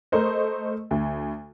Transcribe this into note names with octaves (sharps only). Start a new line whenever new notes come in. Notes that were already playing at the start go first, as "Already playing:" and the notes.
A3 A#4 C5 D#5
D2